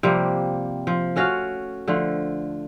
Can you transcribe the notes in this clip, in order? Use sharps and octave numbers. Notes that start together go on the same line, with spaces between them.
C3 F3 G3 A#3
F3
A3 C#4 F#4 F5
D3 F3 A3